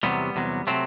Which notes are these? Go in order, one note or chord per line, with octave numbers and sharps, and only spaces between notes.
E2 C3 F#3 G3 B3
E2 C3 F#3
C3 F#3 A3 C4